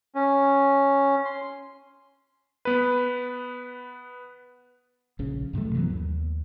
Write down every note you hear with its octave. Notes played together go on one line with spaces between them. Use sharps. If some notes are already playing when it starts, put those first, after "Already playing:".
C#4
C6
B3 B4
A#1 C#3
G2 C3 F#3 A3
E3 F#3 B3
D#2